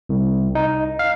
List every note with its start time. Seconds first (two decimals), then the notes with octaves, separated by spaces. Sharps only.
0.09 C2
0.55 D#4
0.99 F5